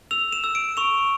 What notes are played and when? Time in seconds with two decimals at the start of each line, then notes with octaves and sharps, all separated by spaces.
0.11 E6 F7
0.32 E7
0.44 E6
0.55 D7
0.77 C#6 F7